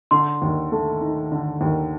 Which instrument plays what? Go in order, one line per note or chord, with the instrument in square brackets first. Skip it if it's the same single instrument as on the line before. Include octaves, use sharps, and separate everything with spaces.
[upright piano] D3 [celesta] C6
[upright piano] D#2
A3
D#4
D3
D#2